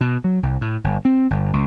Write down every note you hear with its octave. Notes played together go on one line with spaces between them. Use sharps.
B2
F#3
C2
A2
G1
C4
G1
C#2